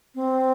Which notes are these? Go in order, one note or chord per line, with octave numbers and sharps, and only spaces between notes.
C4